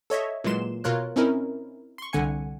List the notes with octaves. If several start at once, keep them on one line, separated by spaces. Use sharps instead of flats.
A4 C#5 D#5 E5
A#2 E3 F#3 G#3 C6 E7
B2 F4 A#4 C#5 F#6
C4 C#4 D#4 E4 A#4
C6 C#6
C2 D3 F#5 G#5 C#7